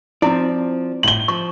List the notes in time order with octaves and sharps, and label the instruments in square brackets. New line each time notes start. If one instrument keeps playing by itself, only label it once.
[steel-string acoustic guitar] F3 [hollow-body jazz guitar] C4 D5 [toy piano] E4
[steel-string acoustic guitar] A2 [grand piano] F#7 G7
[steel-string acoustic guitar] F3 [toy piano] C#6